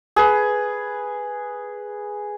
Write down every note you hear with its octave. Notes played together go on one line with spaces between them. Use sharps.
G#4 B4